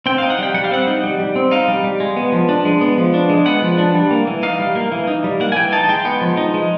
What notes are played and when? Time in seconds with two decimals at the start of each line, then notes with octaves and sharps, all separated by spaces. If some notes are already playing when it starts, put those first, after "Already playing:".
0.06 C4 G5
0.18 D#4 F5
0.30 F#5
0.39 G3 G5
0.54 G3 F#5
0.64 F5
0.71 C4 F#5
0.87 D#4
1.03 G3
1.20 G3
1.36 C4
1.51 D#4 F5
1.68 G3
1.84 G3
2.00 G#3
2.17 B3
2.32 F3
2.49 D4
2.65 G#3
2.81 B3
2.97 F3
3.14 D4
3.30 G#3
3.46 B3 F#5
3.62 F3
3.78 D4
3.95 G3
4.11 A#3
4.27 E3
4.43 D#4 F5
4.59 G3
4.75 A#3
4.92 E3
5.08 D#4
5.24 G3
5.40 A#3 F#5
5.52 G#5
5.56 E3 G5
5.72 D#4 A5
5.89 G#3 G5
6.05 B3
6.21 F3
6.37 D#4
6.54 G#3